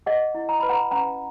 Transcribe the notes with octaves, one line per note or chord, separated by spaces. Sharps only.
G#4 D#5 F#5
E4
A#5
B4 B5
F#5 A#5
C#4 F#5 A#5